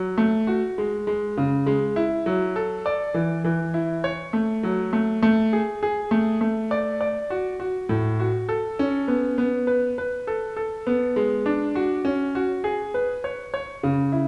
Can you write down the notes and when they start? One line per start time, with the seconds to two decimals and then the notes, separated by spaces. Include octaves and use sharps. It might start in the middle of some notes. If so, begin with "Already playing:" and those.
Already playing: F#3
0.18 A3
0.47 F#4
0.78 G#3
1.07 G#3
1.37 C#3
1.66 G#3
1.96 E4
2.26 F#3
2.56 A4
2.86 D5
3.14 E3
3.44 E3
3.74 E4
4.04 C#5
4.33 A3
4.63 F#3
4.93 A3
5.23 A3
5.53 G#4
5.83 G#4
6.11 A3
6.41 A3
6.71 D5
7.01 D5
7.30 F#4
7.60 F#4
7.89 A2
8.20 F#4
8.49 A4
8.79 C#4
9.08 B3
9.38 B3
9.67 B4
9.98 B4
10.27 A4
10.57 A4
10.87 B3
11.16 G#3
11.46 D4
11.75 F#4
12.05 C#4
12.35 F#4
12.64 G#4
12.94 B4
13.24 C#5
13.54 C#5
13.83 C#3
14.12 E4